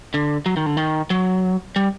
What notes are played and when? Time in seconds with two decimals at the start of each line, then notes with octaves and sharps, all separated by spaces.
0.14 D3
0.46 F#3
0.57 D#3
0.66 D3
0.77 D#3
1.10 F#3
1.76 G3